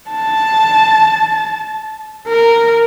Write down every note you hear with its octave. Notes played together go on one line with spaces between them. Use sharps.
A5
A#4